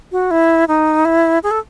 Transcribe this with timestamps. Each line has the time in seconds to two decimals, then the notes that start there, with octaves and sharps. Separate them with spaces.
0.12 F#4
0.31 E4
0.68 D#4
1.05 E4
1.43 G#4
1.51 A4